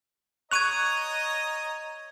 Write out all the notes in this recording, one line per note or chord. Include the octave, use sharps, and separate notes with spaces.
C#5 D#5 A#5 C#6 F#6 G#6 D#7 F7